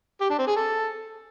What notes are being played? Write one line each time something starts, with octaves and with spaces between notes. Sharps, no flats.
G4
D4
C4
G#4
A4